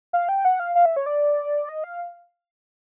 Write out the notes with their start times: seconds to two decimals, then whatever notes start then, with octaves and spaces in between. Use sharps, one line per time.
0.13 F5
0.29 G5
0.45 F#5
0.60 F5
0.75 F5
0.85 E5
0.96 C#5
1.06 D5
1.69 D#5
1.84 F5